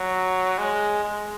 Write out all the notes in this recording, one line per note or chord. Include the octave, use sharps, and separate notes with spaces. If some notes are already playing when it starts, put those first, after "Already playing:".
Already playing: F#3
G#3
G#3